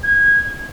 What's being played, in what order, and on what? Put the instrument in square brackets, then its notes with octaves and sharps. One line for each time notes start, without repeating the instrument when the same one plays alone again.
[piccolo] G#6